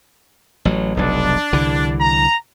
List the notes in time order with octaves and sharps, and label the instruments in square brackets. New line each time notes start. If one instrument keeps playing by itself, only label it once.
[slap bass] A1 F#3
[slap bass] F1 B1 [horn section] D4
[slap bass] C2 D3 E3
[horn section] A#5